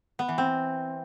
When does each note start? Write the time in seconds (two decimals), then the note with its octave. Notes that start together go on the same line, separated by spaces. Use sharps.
0.19 B3
0.28 E3
0.38 C4